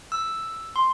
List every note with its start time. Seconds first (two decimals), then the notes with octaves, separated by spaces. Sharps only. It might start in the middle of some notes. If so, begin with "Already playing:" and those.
0.12 E6
0.76 C6